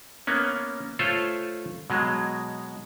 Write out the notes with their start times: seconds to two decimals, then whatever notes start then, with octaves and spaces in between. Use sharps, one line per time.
0.27 A#3 B3 C#4
0.99 A3 F4 A4 C5 C#5
1.90 B2 F#3 G#3